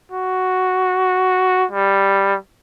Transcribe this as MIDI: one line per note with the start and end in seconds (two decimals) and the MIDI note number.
0.12 1.65 66
1.71 2.36 55